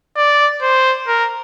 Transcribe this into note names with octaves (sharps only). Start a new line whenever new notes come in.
D5
C5
A#4